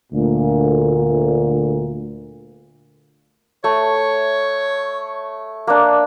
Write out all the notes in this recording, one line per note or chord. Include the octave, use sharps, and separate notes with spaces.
D2 A#2
A3 C#5
A#3 D4